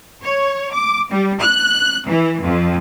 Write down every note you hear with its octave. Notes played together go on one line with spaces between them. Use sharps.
C#5
D6
G3
F#6
E3
F2